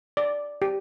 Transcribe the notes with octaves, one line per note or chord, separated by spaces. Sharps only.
D5
G4